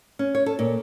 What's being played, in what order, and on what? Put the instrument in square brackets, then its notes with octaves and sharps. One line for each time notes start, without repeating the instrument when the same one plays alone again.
[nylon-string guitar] C#4
C#5
A4
A#2